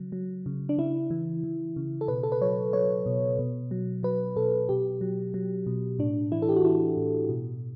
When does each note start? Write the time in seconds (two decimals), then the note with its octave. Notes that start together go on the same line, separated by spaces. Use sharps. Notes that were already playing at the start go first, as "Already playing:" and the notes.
Already playing: C#3 F#3
0.12 F#3
0.46 C#3
0.69 D4
0.78 C#3 E4
1.10 E3
1.44 E3
1.76 C#3
2.01 A4
2.08 B2 B4
2.23 A4
2.32 B4
2.41 F#3 C#5
2.73 F#3 C#5
3.06 B2
3.39 B2
3.71 F#3
4.03 F#3 B4
4.36 B2 A4
4.69 B2 G4
5.01 F#3
5.34 F#3
5.66 B2
5.99 A2 D4
6.32 E3 E4
6.42 A4
6.49 G4
6.56 F#4
6.64 E3 E4
6.97 A2
7.29 B2